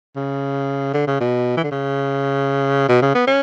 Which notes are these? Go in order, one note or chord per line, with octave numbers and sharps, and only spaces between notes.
C#3
D3
C#3
B2
E3
D3
C#3
B2
C#3
B3
C#4